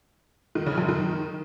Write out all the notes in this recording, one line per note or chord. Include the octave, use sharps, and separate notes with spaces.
D#3
C#3
F#2
D#3